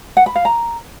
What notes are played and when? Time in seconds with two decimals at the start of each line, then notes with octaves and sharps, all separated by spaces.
0.17 F#5
0.26 B5
0.36 F5
0.45 A#5